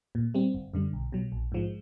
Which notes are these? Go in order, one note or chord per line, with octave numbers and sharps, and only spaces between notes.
A#2
G3 C4
G1
F#2 D3 G3
B1
B2 F#3
A#1
G#2 F3 G#3